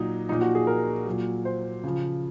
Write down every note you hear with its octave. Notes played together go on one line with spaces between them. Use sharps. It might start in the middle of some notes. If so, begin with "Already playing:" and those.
Already playing: A#2 F#3 D#4
A#2 F3 D#4
F#4
G#4
A#4
A#2 F#3
C5
C#3 F3